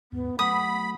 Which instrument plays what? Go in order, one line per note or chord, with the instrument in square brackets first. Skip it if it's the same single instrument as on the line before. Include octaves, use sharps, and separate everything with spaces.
[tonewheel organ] D#2 G#2 [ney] B3
[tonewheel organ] F#3 A3 [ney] F#5 [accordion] B5 [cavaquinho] D#6